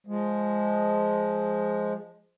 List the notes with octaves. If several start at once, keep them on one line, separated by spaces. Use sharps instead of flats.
F3 G#3